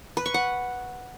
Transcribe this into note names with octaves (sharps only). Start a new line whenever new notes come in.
B4
C#6
F#5